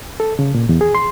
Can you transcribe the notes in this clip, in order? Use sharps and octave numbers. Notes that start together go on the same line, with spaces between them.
A4
C#3
A#2
E2
G#4
C6